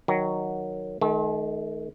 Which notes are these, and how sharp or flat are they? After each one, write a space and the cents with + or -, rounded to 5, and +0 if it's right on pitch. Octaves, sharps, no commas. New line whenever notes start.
D#3 +0 F#3 +0
D#3 +0 A3 -45